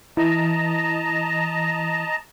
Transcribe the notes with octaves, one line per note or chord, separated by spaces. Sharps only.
E3 D#5 A5 A#5